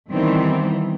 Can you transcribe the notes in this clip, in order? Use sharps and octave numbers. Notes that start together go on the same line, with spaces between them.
D#3 E3 G3 B3 C4 E4